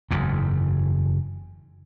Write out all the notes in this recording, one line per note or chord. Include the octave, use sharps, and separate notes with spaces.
F#1 E2 G#2